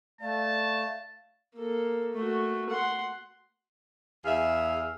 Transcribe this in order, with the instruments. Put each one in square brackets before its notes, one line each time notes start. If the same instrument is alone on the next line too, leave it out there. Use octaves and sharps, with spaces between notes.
[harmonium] A3 [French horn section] D5 [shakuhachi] F5 [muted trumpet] A5
[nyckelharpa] A#3 A4
A3 F#4
F#5 C6
[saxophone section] E2 G#4 E5 F5